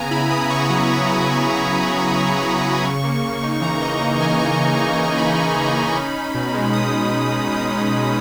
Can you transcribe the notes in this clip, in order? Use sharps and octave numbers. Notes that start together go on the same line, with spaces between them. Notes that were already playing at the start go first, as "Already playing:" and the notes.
Already playing: C#3 B3 G#5 A#5
E4 B5
B3 D#6
E4 C#6
F#3
B3
E4
F#3
B3
E4
F#3
F#3
C#3
F#3
F#3
C#3
A#3
C#3
D#4
E3 A#5
D#4 D#5
A#3
E3 G#5
C#3 A#5
C#3
D#4
E3
A#3 B5
C#3
C#3
D#4
C#4
C#4
B2
G#3
G#3 D#6
B2
G#3
B2
G#3 D#6
C#4
B2